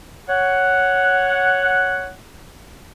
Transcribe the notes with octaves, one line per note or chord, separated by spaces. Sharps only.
C#5 F#5